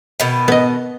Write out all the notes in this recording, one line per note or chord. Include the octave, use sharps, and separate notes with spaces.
B2 D#3
B3 D#5